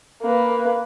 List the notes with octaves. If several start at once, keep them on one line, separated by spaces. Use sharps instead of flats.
A#3 B4